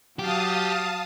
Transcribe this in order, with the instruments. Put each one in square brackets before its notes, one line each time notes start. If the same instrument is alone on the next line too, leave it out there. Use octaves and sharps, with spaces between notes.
[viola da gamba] F#3 [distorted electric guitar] G4 [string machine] F5 A5 D#6